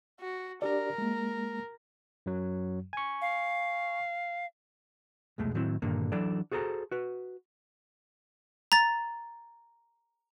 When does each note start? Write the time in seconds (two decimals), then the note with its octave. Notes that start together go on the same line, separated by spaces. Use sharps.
0.20 F#4
0.62 D4 G4 A#4 D5
0.98 G#3 A#3
2.26 F#2 F#3
2.93 G#5 C#6
3.21 F5
5.38 C2 F2 B2 G#3 A3
5.54 A2 D#3 F#3 C4 E4
5.82 G2 A#2 D3 D#3 A#3
6.12 E3 F#3 D4 A4 D5
6.52 F#4 G#4 A4 C5 A#5
6.91 F#4 B4
8.72 A#5 A6